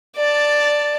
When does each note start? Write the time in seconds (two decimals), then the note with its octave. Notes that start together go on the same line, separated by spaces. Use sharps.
0.17 D5 A5